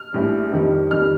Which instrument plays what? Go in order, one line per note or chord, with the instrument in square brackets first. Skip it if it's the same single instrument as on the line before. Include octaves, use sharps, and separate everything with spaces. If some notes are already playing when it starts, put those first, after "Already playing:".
Already playing: [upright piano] F6
A#1 A2 G3
F2 D#3 G3
F2 D#3 G3 F6